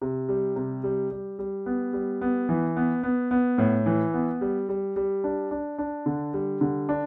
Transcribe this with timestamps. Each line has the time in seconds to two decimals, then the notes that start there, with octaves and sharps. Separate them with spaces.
0.01 C3
0.29 G3
0.56 C3
0.84 G3
1.11 G3
1.39 G3
1.66 B3
1.93 G3
2.21 B3
2.49 E3
2.77 B3
3.03 B3
3.31 B3
3.58 A2
3.86 E3
4.14 B3
4.41 G3
4.69 G3
4.96 G3
5.24 D4
5.51 D4
5.78 D4
6.06 D3
6.34 G3
6.61 D3
6.89 D4